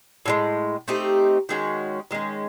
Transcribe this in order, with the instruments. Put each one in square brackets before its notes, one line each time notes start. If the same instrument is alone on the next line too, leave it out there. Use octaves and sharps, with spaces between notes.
[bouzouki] A2 F3 G#3
A3 C4 D#4 G4
D#3 G#3 C#4 F#4
D#3 G#3 C#4